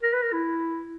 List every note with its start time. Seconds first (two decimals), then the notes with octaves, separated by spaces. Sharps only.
0.03 A#4
0.13 B4
0.23 A#4
0.33 E4